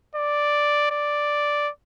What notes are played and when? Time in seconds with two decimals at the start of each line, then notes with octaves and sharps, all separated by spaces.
0.15 D5
0.91 D5